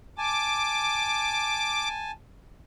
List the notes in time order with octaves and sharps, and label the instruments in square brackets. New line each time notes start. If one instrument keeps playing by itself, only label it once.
[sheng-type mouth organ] G#5 A5 [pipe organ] D6